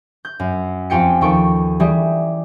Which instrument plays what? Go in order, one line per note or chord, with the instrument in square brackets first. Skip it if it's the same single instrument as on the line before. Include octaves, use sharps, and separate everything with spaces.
[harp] G6
F#2
F2 F4 G4 G5 G#5 C#7
D#2 F3 A4 G5 C#6 D7
E3 G3 G4 G#4